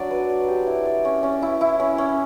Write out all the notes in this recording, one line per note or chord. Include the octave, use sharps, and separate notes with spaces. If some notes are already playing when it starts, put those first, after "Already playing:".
Already playing: F#3 D4 D5
B4
D5
G4
E4
D5
C#4
C#4
E4
E4
C#4
C#4